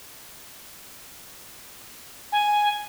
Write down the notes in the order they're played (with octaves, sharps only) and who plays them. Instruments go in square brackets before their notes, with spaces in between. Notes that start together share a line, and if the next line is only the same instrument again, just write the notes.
[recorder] G#5